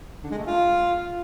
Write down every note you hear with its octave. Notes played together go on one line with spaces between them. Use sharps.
D3
G#3
A3
F4